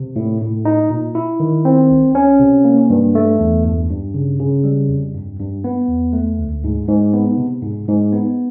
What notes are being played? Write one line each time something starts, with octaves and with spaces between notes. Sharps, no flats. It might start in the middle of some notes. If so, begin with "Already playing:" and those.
Already playing: C3
A2
A2
D#4
A#2
E4
D#3
C4
C2
C#4
C3
A#3
G2
A3
E2
G2
G2
C#3
C#3
G3
F2
G2
G2
B3
E2
A3
D2
G#2
G#2
B3
C3
G#2
G#2
B3